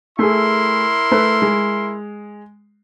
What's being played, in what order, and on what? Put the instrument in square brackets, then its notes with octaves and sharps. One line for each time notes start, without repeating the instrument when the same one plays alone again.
[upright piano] A3 G#4 [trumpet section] E4 A#4 C6
[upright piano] A3 B4
G#3